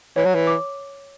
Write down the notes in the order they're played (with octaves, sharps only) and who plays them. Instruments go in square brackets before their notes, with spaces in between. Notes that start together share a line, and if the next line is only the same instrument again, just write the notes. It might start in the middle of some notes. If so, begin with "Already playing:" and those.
[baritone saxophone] E3 [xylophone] C#5
[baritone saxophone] F#3
E3
[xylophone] D6